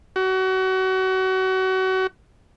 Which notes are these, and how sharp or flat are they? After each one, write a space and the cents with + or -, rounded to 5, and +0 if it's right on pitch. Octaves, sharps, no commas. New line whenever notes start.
F#4 +30